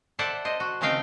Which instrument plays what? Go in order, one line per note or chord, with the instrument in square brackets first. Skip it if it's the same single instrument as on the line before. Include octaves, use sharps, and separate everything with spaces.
[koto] A4 C5 D5 E5 F#5
C5 D#5
F#4
C#3 A3 C4 D#4 F5 G5